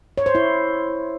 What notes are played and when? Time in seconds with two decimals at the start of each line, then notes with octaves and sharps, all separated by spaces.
0.18 C#5
0.26 C5
0.35 E4